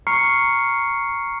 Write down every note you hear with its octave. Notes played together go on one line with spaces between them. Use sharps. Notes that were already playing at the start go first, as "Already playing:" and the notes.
A#5 C#6 F6 C7 C#7